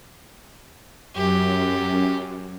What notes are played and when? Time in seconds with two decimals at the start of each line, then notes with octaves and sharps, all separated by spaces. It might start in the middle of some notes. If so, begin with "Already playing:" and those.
1.15 F#2 G4